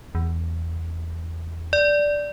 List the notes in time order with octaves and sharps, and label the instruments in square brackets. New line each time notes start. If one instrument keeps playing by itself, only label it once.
[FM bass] E2
[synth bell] D5